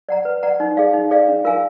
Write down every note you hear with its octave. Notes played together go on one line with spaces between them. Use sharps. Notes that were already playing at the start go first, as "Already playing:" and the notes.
D5 F#5 A#5
B4
D5 F#5 A#5
D#4
G#4 D5 F5
D#4
G#4 D5 F5
D4
F4 A#4 F5 G#5